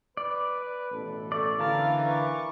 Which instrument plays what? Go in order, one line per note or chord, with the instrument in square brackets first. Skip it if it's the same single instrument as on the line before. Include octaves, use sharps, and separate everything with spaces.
[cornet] B4 [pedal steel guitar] D5
[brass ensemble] A1 B2 A4
[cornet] A3 [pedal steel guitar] D5
[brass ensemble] D3 E3 [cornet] E4 [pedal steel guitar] A#4 A5 [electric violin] F5
[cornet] B4 [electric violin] C#6 D6